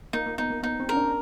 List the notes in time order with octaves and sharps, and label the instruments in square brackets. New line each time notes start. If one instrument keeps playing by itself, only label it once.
[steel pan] A#3 [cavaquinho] D#4
[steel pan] A#3
[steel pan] B3 [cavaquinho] D#4
[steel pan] A#3
[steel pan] B3 [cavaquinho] D#4
[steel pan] C4
[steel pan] C#4 [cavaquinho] A#4
[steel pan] D4